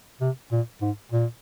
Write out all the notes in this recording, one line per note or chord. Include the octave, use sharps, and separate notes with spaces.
C3
A#2
G#2
A#2